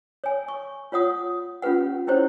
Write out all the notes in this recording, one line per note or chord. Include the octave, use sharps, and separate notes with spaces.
C#5 G#5
C#6
F4 C#5 F#5 D#6
C#4 F4 G4 B4 F#5
C#4 E4 G4 C5 C#5